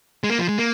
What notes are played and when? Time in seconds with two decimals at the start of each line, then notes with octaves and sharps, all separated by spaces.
0.24 G#3
0.30 A#3
0.39 F3
0.49 G#3
0.59 A#3